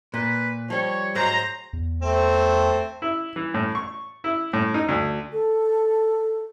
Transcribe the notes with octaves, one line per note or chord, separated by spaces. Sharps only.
A#2 B4
F3 G3 C#5
G#2 F#3 G#4 C5 A#5
E2
A3 C4
E4
E3
A2
C#6
E4
A2
D#4
D2
A4